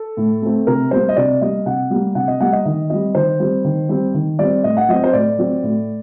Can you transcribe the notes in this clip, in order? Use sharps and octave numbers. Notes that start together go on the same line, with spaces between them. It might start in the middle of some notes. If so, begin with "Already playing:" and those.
Already playing: A4
A2
A3 C4
C3 A#4
G3 A#3 C5
D#5
C3 D5
G3 A#3 D#5
C3 F#5
G3 A#3
C3 F#5
D#5
G3 A#3 F#5
D#5
D#3 D#5
G3 C4 D#5
D#3 C5
G3 C4
D#3
G3 C4
D#3
G3 C4 D5
A2 D#5
F#5
F#3 C4 D#5
C5
A2 D5
F#3 C4
A2